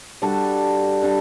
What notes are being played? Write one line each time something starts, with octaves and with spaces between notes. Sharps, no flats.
G3 D4 F#4 A4
G3 D4 F#4 A4